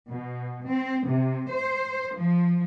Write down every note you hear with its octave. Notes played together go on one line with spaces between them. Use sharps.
B2
C4
C3
C5
F3